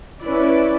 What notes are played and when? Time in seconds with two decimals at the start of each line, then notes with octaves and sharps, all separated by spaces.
0.23 C#4 E4 B4 D5